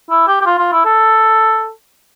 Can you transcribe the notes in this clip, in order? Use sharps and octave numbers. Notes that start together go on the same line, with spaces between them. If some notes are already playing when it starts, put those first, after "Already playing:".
E4
G4
G4
F4
F4
E4
A4